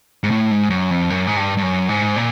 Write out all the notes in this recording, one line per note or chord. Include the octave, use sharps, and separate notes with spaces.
G#2
A2
G#2
F#2
F2
F#2
G#2
G2
G2
F#2
G#2
A#2